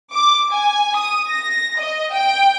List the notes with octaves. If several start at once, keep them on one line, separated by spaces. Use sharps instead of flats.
D6
G#5
D#6
A#6
D#5
G5